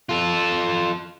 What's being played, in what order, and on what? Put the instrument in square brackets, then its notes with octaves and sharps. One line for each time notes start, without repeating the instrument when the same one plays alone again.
[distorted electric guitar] F4 A4